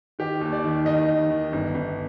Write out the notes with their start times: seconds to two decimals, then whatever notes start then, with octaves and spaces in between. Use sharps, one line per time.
0.19 D#3 G4
0.41 D#2
0.52 D5
0.64 D#3
0.86 D#3 D#5
1.08 D#3
1.31 D#3
1.53 G1
1.75 G1